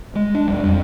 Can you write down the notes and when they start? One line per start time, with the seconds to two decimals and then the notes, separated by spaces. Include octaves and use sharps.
0.15 G#3
0.35 D4
0.48 D#1 E2 G3
0.64 F2